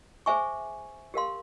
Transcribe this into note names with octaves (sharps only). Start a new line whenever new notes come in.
G#4 C5 E5 G#5 C#6
G4 A#4 F5 C6